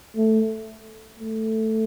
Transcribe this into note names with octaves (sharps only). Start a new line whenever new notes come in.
A3
A3